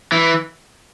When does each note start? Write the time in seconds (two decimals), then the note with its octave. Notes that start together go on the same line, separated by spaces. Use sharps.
0.12 E3